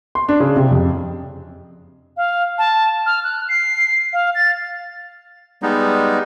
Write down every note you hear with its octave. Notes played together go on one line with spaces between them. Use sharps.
C6
D4
C#3
C3
F2
F5
A5
F6
F#6
C7
F5
A6
G3 G#3 B3 D#4